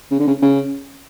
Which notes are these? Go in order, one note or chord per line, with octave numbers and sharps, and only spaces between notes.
C#3
D3
C#3
C#3